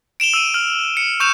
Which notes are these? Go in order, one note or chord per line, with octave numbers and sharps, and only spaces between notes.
D7 E7 F7 G7
E6 D#7
F6
C#7
C#6 G6 E7 F7